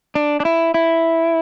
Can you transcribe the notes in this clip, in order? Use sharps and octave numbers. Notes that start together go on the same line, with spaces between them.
D4
D4
E4
E4